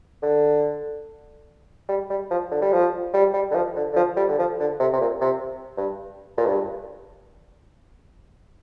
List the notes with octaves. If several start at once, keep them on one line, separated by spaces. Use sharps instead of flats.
D3
G3
G3
F3
D3
G3
F3
G3
G3
D3
F3
D3
D3
F3
G3
D3
F3
D3
C3
C3
A#2
C3
G2
A#2
G2